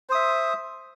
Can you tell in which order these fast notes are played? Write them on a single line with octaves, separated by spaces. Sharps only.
C5 D#6 E5